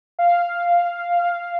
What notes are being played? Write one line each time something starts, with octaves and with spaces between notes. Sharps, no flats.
F5